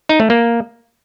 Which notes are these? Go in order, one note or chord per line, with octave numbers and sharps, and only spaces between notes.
D#4
A3
A#3